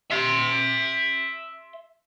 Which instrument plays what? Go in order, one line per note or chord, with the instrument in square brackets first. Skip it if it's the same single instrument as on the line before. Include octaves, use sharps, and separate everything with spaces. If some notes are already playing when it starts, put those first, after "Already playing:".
[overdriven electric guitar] E5 C6